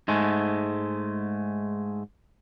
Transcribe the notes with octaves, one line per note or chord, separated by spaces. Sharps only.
G#2 G#3 A3